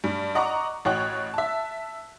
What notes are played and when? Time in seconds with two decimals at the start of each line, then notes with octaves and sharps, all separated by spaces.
0.04 G2
0.35 D#5 F#5 A#5 C#6 D6
0.85 A1 F#4 C#5 D#5 G5 F#6
1.34 E5 A5